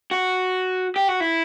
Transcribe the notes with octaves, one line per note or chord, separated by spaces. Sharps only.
F#4
G4
F#4
E4